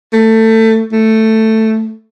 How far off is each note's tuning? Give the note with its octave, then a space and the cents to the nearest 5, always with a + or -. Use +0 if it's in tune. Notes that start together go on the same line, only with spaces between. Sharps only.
A3 +20
A3 +5